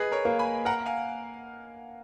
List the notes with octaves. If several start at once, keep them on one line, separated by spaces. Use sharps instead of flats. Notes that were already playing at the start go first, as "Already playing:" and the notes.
Already playing: G#4 B4 D#5
A#4 C#5
A#3
G#5 B5
A#4 F#5 A#5
F5 G#5